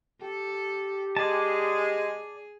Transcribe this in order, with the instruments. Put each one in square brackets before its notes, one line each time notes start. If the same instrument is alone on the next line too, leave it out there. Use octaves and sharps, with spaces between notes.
[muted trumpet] G4 [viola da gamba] A4
[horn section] G#3 [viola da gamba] G#4 [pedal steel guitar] D5 A5